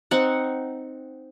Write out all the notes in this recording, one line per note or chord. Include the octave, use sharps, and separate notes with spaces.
C4 D#4 F#5